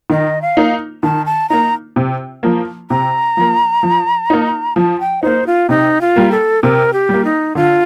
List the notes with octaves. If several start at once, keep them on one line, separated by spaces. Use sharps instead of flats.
D#3 D#5
F5
A#3 D#4
D#3 A5
A5
A#3 D#4 A#5
C3
F3 A#3
C3 A#5
F3 A#3
F3
A#3 D#4
F3 A5
G5
A#3 D#4 C5
F4
C3 D#4
F4
G3 A#3
A4
C3 A#4
G4
G3 A#3
D#4
D3 F4